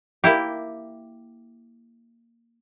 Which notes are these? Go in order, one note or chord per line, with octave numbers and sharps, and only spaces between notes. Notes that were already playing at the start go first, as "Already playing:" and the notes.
A#3 E4 G4